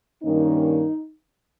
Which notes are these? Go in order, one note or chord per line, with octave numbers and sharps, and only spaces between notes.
G2 D#3 A#3 C#4 D#4